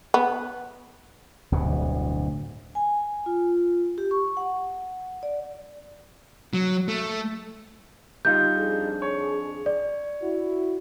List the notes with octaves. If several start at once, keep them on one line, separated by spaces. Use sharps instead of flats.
B3
D1 D2 G2 B2
G#5
F4
G4
C#6
F#5
D5
F#3
A3
G3 D#4 F4 G6
F2 D4 G#4
C#5
D5
E4 F#4